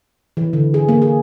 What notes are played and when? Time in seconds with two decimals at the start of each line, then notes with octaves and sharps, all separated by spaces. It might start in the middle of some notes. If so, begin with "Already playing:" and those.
0.37 E3
0.53 D3
0.74 G#4
0.89 A#3
1.02 G#4